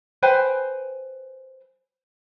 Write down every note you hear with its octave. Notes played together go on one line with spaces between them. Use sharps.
B4 C5 G5 G#5